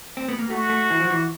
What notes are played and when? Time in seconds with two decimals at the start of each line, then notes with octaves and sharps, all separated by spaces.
0.17 C4
0.28 B3
0.39 A#3
0.50 A3 F#4
0.70 A3
0.90 E3
1.00 F3
1.10 E3